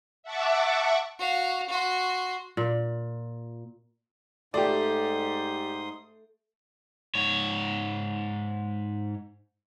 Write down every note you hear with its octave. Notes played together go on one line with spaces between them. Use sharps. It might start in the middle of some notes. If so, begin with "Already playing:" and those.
E5 F#5 A5 C#6 D6
F#4 F5
F#4 C6
A#2
G#2 A3 G4 D5 C6 D#6
G#2 C#5